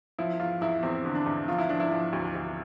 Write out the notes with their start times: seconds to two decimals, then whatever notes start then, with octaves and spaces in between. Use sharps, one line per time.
0.19 F3 E4
0.40 E2 F4
0.61 E2 E4
0.83 E2 C4
1.05 D3
1.15 D4
1.26 E2
1.48 F3 F4
1.58 E4
1.69 F3 D4
1.80 E4
1.91 F3
2.13 D2
2.35 D2